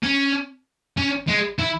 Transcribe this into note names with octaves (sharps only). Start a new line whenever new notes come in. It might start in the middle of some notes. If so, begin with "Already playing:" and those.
C#4
C#4
G#3
E4